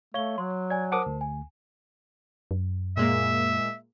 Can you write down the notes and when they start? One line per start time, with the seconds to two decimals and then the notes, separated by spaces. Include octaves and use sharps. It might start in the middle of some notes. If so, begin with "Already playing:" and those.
0.14 A3 C#5 F5 G7
0.38 F#3 C6
0.70 D5 G#5 G#6
0.92 A#4 C5 F#5 A5 D6 D#6
1.06 D2
1.21 G#5
2.51 F#2
2.97 A#2 G#3 A#3 E5